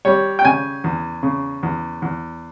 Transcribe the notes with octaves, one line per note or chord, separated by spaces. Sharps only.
G3 C#5
G5
C#3 G#5
E2
C#3
E2
E2